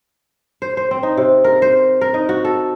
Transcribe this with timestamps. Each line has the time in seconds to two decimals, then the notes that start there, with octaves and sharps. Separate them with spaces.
0.62 C5
0.77 C5
0.91 C4
1.03 D#4
1.17 C3
1.44 A#4
1.62 C5
2.01 A#4
2.14 D#4
2.29 F#4
2.44 A4